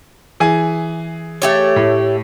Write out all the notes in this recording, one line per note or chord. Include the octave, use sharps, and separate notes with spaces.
E3 G#4 G#5
A3 G4 C#5
A2